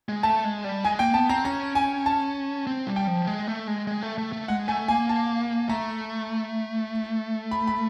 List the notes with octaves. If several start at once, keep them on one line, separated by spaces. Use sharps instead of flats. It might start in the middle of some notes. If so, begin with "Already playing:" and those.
G#3
A3 A5
G#3
G3
G#3 G#5
A#3 G5
B3 A5
C4 A#5
C#4 A#5
G#5
A5
C4
G3
G5
F3
G#3
A3
G#3
G#3
A3
A3
A3
G#3 F#5
A3 G#5
A#3 G#5
A5
A3 A#5
B5
B5